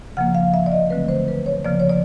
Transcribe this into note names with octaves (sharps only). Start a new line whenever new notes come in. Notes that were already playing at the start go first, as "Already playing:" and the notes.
C#3 F3 A#3 F#5
F5
E5
D5
D#5
D3 F#3 A3 C4 B4
C5
B4
C#5
C#3 F3 A#3 D5
C#5
D5